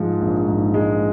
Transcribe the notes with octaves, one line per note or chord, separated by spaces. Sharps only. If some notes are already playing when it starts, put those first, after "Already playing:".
Already playing: G#2 F3 G#3
A#1
G#2
G#3